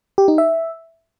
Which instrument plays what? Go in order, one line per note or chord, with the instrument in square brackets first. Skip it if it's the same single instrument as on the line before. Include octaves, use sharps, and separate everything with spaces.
[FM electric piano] G4
D#4
E5